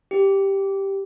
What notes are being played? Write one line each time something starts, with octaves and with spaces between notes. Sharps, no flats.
G4